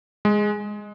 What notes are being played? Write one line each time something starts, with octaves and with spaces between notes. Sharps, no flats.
G#3